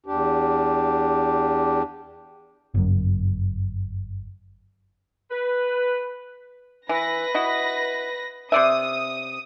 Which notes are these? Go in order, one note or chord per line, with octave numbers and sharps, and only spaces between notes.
E2 D4 G4
G1 F#2
B4
E3 B4 A#6
E4 F#4 D#5
C3 D5 E5 D#6